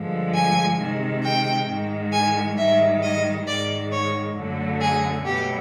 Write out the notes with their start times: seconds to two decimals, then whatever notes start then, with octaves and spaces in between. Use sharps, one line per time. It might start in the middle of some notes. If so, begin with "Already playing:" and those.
Already playing: G2 D3 F3 G#3
0.35 G#5
0.79 C3 D#3 G#3
1.24 G5
1.69 G#2 D#3 G#3
2.13 G#5
2.58 G#2 D#3 G3 E5
3.03 D#5
3.47 G#2 D#3 G#3 D5
3.92 C#5
4.36 F#2 D3 F#3 A3
4.81 G#4
5.26 B2 F#3 A3 G4